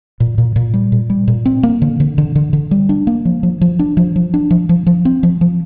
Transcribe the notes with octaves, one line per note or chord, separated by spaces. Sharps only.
A#2
A#2
A#2
G3
A#2
G3
A#2
C4
A#3
D3
D3
D3
D3
D3
G3
D4
A#3
F3
F3
F3
D4
F3
F3
D4
F3
F3
F3
C4
F3
F3